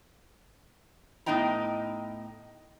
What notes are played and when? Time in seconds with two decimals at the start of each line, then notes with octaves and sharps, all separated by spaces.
1.26 A2 B3 D#4 D#5 G5 A#5